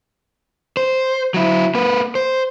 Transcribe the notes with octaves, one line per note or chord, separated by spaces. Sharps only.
C5
F#3 E4
A#3 B4
C5